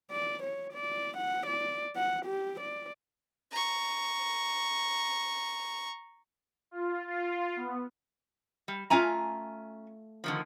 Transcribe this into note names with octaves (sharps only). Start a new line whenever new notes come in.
D5
C#5
D5
F#5
D5
F#5
G4
D5
A#5 C#6
F4
F4
B3
G3
A3 C#4 F4 G#5 A#5
D3 D#3 F3